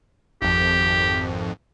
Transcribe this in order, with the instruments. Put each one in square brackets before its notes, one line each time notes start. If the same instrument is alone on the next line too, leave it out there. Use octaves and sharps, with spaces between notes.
[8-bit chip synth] G#1 F2 [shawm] G4